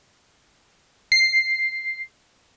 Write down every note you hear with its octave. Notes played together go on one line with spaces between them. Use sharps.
C7